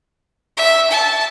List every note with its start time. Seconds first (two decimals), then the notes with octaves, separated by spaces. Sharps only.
0.57 E5
0.90 A5